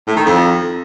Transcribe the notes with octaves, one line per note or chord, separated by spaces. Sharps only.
A2
D#3
F2